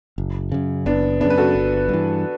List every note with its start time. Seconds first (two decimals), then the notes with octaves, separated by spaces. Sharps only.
0.18 F#1
0.52 F#2 C#3
0.86 F#1 B3 D4
1.20 F#2 C#3 B3 D4
1.30 B4
1.38 F#4 A4
1.55 G1
1.89 G2 E3